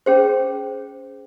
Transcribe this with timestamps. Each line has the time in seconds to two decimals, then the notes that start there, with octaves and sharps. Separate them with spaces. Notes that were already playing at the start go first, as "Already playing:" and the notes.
0.06 C#4 G#4 C5